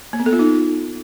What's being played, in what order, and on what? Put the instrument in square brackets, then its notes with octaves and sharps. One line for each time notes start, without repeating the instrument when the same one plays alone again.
[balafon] A#3
B3
A4
F4
D#4